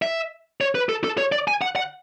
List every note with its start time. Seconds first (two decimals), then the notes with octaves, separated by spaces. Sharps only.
0.02 E5
0.61 C#5
0.75 B4
0.89 A4
1.04 A4
1.18 C#5
1.32 D5
1.48 G#5
1.62 F#5
1.76 F#5